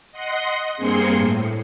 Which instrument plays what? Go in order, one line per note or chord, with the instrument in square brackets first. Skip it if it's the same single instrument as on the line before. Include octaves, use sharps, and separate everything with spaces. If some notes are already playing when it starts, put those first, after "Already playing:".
[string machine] D#5 F#5 C6
G2 A#3 C4 G#4 C6 C#7
A2